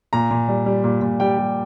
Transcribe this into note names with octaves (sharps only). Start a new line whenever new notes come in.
A#2 A#5
A#2
G3
G3
A#2
A#2
G3 G5
G3